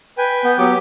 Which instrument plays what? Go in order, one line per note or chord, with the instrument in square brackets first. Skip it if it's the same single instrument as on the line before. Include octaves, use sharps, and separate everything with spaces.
[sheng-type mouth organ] B4 G5 G#5
[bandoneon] B3 G6
[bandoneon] F#3 [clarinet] B3 [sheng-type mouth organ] G4 D6